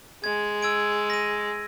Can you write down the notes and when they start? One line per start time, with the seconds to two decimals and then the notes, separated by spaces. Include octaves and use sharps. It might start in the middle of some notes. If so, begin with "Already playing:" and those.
0.24 G#3 G#6
0.62 E6 G#6 D7
1.10 A#6 D#7